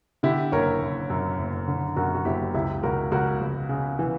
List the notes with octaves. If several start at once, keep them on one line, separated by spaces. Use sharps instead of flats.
D3 E4 G4
F#1 A#4 C#5
F#1
F#2
F#1
D3
F#2 F#4 A#4
F#4
F#1 E4 G4
C#2 E4 G4
C#2 F#4 A#4
C#2 F#4 A#4
C#2
C#3
E3